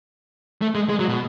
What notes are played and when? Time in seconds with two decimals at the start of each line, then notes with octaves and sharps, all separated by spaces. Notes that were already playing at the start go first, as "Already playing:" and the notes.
0.61 A3
0.75 G#3
0.89 G#3
0.99 F#3
1.08 B2